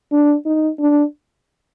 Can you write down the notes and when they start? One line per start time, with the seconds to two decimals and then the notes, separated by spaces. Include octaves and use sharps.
0.12 D4
0.46 D#4
0.80 D4